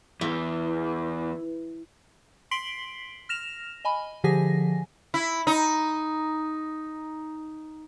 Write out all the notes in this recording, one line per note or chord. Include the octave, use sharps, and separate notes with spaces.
E2 E3
C6 B6 C7 D7 F#7 G7
F6 A#6 E7 F7
D#5 G#5 B5
D3 F3 G4 G#4 G#5 A#6
E4
D#4